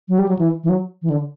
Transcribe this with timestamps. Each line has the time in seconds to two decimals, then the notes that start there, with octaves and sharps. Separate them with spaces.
0.09 F#3
0.19 G3
0.29 F#3
0.39 E3
0.64 E3
0.69 F#3
1.02 E3
1.10 D3